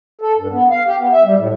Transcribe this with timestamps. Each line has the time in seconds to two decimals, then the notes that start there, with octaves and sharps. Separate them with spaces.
0.21 A4
0.38 G2
0.52 B3
0.71 F5
0.87 G4
0.99 B3
1.12 E5
1.24 G3
1.37 A2